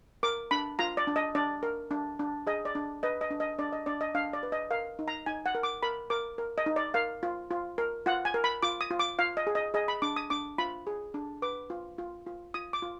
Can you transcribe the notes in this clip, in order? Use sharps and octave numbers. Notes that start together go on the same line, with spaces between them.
A#4 D6
D4 B5
F4 A#5
D5
D4
D#5
D4 D5
A#4
D4
D4
G#4 D#5
D5
D4
B4 D#5
D#5
D4
D#5
D4 D5
D#5
D4 D5
D#5
D4 F5
D5
B4
D#5
A#4 F5
D#4
A#5
D#4 G#5
F#5
A#4
D6
A#4 B5
A#4 D6
A#4
D#5
D#4
D5
A#4 F5
F4
F4
A#4
F4 F#5
G#5
A#4
B5
F4 D6
D#6
F4
D6
F4 F5
D#5
G#4
D#5
G#4 D#5
B5
D4 D6
D#6
D4 D6
F4 B5
G#4
D4
B4 D6
F4
F4
F4
F4 D#6
D6
F4